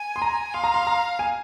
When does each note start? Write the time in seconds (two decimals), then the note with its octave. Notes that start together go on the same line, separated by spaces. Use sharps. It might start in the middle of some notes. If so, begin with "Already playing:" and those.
Already playing: G#5
0.16 C6
0.22 A#5
0.54 F5 C6
0.64 A#5
0.74 C6
0.87 A#5
1.19 G#5